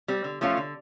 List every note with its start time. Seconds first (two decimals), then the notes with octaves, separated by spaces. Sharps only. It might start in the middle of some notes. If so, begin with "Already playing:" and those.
0.08 G3 C4
0.24 D3
0.41 F3 A3 C#4 F4
0.57 D3